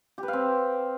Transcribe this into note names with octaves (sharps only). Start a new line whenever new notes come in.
G4
B4
F5
C4